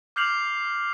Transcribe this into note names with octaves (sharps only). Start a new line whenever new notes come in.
D6 F6 G6 C7 F7 F#7